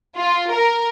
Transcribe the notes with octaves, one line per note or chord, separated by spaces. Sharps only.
F4
A#4